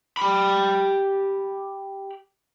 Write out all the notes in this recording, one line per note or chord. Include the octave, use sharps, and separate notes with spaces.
G4 B5